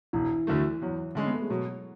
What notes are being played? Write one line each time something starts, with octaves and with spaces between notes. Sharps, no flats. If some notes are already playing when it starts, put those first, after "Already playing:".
E1 E3
D2 D3 F#3 A3
E2 F#3
D3 G#3 C#4
B3
A3
G#3
B2 F#3